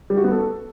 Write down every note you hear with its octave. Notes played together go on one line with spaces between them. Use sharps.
G3
F#4
B3
A4